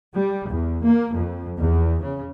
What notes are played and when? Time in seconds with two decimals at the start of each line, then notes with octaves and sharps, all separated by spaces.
0.13 G3
0.48 E2
0.81 A#3
1.15 F2
1.59 E2
2.02 C#3